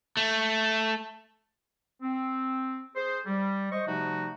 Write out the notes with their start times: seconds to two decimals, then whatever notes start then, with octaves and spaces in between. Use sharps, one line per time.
0.17 A3
2.02 C4
2.96 G#4 C5
3.26 G3
3.72 C5 D#5 C#6
3.87 C3 F3 G3 A3 D#4 F#4